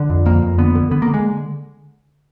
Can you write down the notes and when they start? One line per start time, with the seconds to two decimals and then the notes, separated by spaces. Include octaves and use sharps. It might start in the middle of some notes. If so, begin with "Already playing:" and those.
Already playing: D3
0.10 F2
0.26 F2 A#3
0.42 F2
0.58 D3 B3
0.75 D3
0.91 D3 B3
1.02 A#3
1.08 D3
1.14 G#3